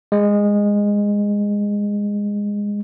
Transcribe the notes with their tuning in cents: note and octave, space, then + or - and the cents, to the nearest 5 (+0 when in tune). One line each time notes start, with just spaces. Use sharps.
G#3 -15